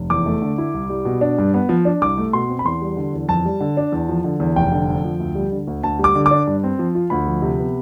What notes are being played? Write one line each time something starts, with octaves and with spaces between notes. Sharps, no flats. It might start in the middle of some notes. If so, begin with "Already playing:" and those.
Already playing: F1
E2 D6
A3
D3
E4
C2
G3
B2
D4
G2
B3
F3
D4
C2 D6
A3
B2 C6
C4
B5
E2 C6
G3
D3
E2
F2 A5
G3
D3
D4
E2
F3
D3
E2
F1 G5
D3
F2
F3
D2
G3
D3
D2
D2 A5
G3
D6
D3
D6
D4
G2
C4
F3
F4
D2 B5
F3
C3
B3